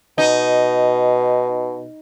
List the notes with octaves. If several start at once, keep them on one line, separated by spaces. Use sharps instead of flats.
B2 D#4